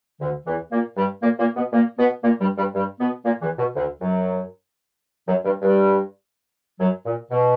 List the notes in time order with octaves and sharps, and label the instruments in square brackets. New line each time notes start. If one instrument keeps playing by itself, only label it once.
[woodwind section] D2 D3
E2 E3
A#2 A#3
G2 G3
A#2 A#3
A#2 A#3
B2 B3
A#2 A#3
B2 B3
A#2 A#3
G2 G3
G2 G3
G2 G3
B2 B3
A#2 A#3
E2 E3
B2
D2 D3
F#2 F#3
F#2 F#3
G2 G3
G2 G3
F#2 F#3
A#2
B2